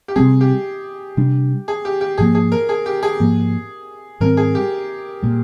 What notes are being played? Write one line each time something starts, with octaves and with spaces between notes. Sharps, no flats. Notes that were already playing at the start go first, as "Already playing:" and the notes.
G4
C3 G3 C4 G#4
G4
C3 G3 D4
G#4
G4
G4
G#2 F3 A#3 G#4
G#4
A#4
G#4
G4
G#4
G#2 F3 A#3
G#2 D#3 G3 C4 A#4
G#4
G4
A#2 G3